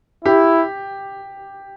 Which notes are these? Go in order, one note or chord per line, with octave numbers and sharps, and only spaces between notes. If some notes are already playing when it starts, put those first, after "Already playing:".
E4 G4